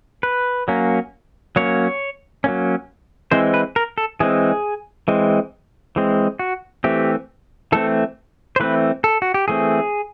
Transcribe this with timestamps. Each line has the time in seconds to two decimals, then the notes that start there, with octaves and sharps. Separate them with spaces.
0.23 B4
0.68 F#3 A#3 C#4
1.56 F#3 A#3 C#4 C#5
2.44 F#3 A#3 C#4
3.31 E3 G#3 C4 C5
3.54 B4
3.76 A#4
3.98 A4
4.20 E3 G#3 C4 G#4
5.08 E3 G#3 C4
5.96 E3 G#3 C4
6.39 F#4
6.84 E3 A3 C4 G4
7.72 E3 A3 C4 A4
8.56 C5
8.60 E3 A3 C4 B4
9.04 A4
9.22 F#4
9.34 G4
9.48 E3 A3 C4 G#4